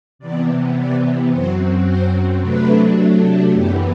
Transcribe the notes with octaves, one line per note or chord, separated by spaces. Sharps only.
C3 E3 B3 D5
D5
F#2 F#3 C4 C5
C5
C3 F#3 A3 D4 B4
F#2 E3 B3 G4